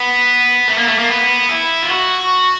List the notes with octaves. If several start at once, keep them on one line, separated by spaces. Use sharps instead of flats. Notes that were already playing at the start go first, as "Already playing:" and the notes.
Already playing: B3
A3
A#3
A3
A#3
B3
E4
F4
F#4